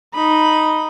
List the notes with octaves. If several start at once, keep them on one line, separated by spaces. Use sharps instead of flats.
D#4 B5